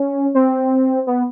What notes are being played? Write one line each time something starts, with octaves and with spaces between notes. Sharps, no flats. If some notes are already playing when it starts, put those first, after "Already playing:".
Already playing: C#4
C4
B3